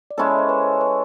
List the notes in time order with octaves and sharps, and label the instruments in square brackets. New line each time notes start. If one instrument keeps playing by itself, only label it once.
[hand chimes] D5
[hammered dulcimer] G#3 C#4 E4 A4 [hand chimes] C#5 D#5
[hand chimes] C5
B4 C#5
B4 C#5